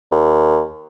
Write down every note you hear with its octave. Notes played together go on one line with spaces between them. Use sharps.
D#2